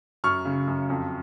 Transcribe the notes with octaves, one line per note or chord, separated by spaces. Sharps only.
F#2 C#6 F6
C#3
F#2
F2